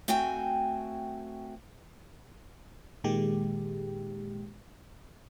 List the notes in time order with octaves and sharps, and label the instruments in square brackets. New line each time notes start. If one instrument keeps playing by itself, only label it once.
[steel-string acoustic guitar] A3 C4 F#4 G5 G#5
[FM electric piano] A#2 D#3 G#3 G4